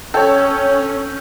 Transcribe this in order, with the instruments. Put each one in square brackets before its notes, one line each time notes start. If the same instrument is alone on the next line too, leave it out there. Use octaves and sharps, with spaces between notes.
[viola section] C#4 [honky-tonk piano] A4 C#5 [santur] G5